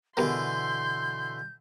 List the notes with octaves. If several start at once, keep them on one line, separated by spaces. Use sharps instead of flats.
B2 D3 E3 B3 G4 A#4 C6 G6